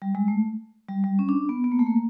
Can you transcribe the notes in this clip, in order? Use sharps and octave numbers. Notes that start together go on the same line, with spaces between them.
G3
G#3
A3
G3
G3
C#4
D4
B3
B3
A#3
A3
A#3